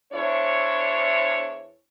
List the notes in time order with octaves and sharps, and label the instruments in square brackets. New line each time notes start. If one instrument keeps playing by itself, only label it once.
[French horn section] E2 D4 E4 C5 C#5